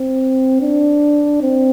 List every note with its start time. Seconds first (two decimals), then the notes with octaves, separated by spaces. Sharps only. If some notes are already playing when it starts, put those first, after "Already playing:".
Already playing: C4
0.61 D4
1.42 C4